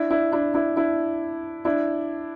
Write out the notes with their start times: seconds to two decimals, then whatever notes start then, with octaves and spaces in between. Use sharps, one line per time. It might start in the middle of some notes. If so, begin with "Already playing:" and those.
Already playing: D4 E4
0.11 D4 E4
0.32 D4 E4
0.54 D4 E4
0.76 D4 E4
1.65 D4 E4